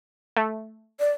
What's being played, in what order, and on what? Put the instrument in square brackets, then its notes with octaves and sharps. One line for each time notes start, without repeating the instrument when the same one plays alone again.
[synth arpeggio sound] A3
[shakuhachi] D5